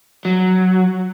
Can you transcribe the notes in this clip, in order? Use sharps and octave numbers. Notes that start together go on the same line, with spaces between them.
F#3